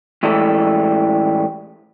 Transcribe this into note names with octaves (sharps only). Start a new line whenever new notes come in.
A2 E3 G3 G#3 A4